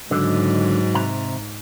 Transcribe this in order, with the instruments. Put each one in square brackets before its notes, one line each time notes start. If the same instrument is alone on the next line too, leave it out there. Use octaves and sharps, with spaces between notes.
[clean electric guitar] C#2 D3 [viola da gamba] G#2 [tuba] F#3
[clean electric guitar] C3 A#5